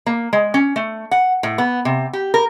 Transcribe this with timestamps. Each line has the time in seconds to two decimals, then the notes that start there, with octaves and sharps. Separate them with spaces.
0.06 A#3
0.33 G#3
0.54 C#4
0.76 A3
1.11 F#5
1.43 A2
1.58 B3
1.85 C3
2.13 G4
2.34 A#4